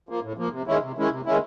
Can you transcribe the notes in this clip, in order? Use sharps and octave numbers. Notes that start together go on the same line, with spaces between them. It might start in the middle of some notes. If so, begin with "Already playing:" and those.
F3 A#3
A2
F3 A#3
C3
D#3 G#3 C#4 E4
C3
D#3 G#3 C#4 E4
C3
D#3 G#3 C#4 E4